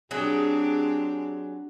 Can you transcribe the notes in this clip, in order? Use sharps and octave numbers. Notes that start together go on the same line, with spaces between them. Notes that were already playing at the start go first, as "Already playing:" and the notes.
F#3 C4 D4 G4 G#4